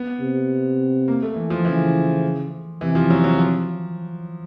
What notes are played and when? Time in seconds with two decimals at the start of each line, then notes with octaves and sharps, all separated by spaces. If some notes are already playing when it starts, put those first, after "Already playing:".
Already playing: B3
0.20 C3
1.08 A#3
1.23 A3
1.36 E3
1.50 F3
1.65 C#3 E3
2.81 C3 E3
2.95 F3
3.10 F#3
3.24 F#3
3.38 F3